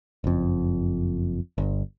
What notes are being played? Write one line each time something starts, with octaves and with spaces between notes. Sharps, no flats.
F#1 F2
G1